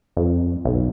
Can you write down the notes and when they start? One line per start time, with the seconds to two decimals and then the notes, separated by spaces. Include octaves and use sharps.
0.17 F2
0.65 B1